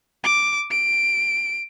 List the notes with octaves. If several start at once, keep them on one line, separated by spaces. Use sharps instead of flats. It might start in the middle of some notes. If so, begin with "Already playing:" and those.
D6
D7